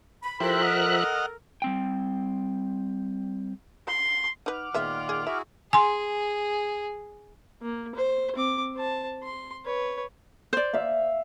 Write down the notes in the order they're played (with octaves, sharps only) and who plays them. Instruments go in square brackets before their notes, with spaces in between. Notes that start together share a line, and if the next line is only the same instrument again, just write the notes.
[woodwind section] B5
[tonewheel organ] F3 E5 F#6 [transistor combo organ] E4 G4 C5 [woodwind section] A4 A#4
[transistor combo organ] D#5 F#5 F6
[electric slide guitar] G3 C4 G5
[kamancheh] C6
[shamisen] D#4 B4 [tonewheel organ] F#5 D6 F6
[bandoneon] A#2 D#3 F4 [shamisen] G#3 B3 E5
[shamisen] G#4
[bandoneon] E4 F#4 G#4 [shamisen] E5
[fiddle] G#4 [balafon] G#5 C6
[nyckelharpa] A#3
C5
C4 D6
C5 A5
C6
B4 C#5
[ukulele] C5 D5
[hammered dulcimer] E5 F5